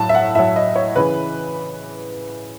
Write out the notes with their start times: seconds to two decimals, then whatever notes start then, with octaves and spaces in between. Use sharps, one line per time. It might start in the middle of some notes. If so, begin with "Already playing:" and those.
Already playing: A2 F#3 A5
0.09 E5
0.15 F#5
0.35 A2 E5
0.39 F#3
0.56 D#5
0.76 C#5
0.96 C#3 E3 B4